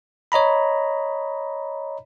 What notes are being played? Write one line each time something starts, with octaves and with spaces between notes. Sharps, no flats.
C#5 D#5 A#5 B5